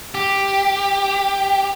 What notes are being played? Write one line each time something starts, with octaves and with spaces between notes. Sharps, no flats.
G4